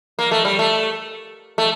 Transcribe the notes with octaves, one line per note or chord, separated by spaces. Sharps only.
A#3
A3
G3
A3
A3